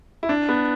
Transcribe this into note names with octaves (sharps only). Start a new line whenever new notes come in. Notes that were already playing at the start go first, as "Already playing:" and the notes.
E4
D4
B3